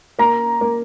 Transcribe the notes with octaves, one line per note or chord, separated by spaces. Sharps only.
A#3 A#5
A#3